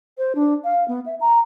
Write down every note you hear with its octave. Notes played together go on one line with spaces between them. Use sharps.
C5
D4
F5
B3
E5
A#5